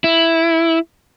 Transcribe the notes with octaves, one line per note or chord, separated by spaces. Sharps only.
E4